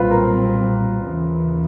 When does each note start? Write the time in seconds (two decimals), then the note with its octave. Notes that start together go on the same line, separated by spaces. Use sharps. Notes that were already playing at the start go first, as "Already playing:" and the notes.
Already playing: B1 A#2 G3 C4 F4 B4
0.11 A#4
1.05 D#2 C#3 E3